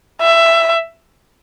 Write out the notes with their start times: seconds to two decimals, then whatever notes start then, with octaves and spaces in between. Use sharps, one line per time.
0.21 E5